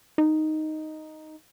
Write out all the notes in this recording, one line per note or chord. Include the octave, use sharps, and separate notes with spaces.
D#4